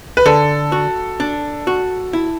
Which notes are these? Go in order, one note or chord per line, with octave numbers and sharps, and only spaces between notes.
B4
D3 A4
F#4
D4
F#4
E4